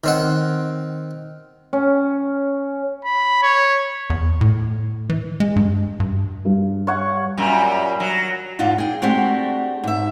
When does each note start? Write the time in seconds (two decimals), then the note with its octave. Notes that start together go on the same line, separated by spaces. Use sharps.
0.04 D#3 C4 F#5
1.73 C#4
3.05 B5
3.43 C#5
4.10 E2
4.41 A2
5.09 E3
5.40 G#3
5.56 G2
6.00 G2
6.45 G2
6.87 C#5 F#5 C#6
7.37 F#2 A#2 G3
8.00 F#3
8.59 E2 G#2 C#3 F4 F#5
8.78 G#4 G5
9.02 G#3 A3 C4 D4 F#4 G4
9.84 G#2 E5